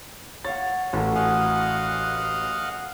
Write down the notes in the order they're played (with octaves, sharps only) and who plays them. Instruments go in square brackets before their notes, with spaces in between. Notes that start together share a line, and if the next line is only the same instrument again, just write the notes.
[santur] C#5 F5 F#5 [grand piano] A6
[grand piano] A1 [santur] F#4 A4 A#4
[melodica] D#5 F5 F#5 [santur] G#5